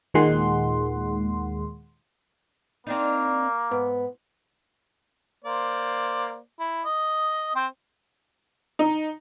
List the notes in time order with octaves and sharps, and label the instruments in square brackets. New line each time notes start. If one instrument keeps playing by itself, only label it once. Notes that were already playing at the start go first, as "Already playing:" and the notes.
[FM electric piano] D#2 A#2 D#3 G#3 F#5 C6
[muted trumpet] A#3 [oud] C4 D4 D#4
[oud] G#2 [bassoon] B3
[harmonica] A#3 C5 D5
E4
D#5
C4 C5 G5
[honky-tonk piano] D#4